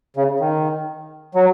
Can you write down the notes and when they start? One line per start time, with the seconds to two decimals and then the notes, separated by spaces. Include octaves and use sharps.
0.16 C#3
0.40 D#3
1.35 F#3